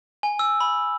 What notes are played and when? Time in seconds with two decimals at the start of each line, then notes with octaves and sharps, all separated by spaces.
0.23 G#5
0.39 E6
0.61 B5